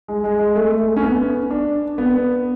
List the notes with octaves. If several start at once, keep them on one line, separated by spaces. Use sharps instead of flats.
G#3
G#3
G#3
A3
A3
C#4
B3
D4
B3